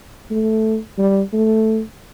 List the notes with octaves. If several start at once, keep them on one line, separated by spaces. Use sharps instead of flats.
A3
G3
A3